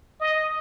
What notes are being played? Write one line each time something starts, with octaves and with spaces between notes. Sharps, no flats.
D#5